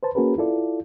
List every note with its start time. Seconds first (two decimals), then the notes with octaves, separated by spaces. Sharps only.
0.03 B4 C5 A5
0.15 A#3 C#4 F#4 G#4 A#4 B4
0.38 E4 F4 A4 D5